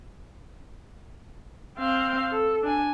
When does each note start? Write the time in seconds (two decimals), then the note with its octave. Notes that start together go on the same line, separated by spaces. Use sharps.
1.79 C4 F5
2.31 A4
2.63 D4 G#5